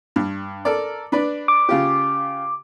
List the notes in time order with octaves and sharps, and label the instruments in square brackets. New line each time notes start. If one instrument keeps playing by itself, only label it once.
[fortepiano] G2
A4 A#4 D5
D4 B4 D5
[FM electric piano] D6
[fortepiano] C#3 F4 G4